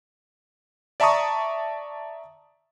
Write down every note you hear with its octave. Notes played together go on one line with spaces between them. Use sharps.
D5 E5 A5 A#5 C#6 D#6